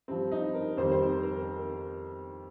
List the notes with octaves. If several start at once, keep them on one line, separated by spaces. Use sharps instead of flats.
G2 F3 C4
D#4
A#4
F2 D#3 G3 C5
C5
A#4
A#4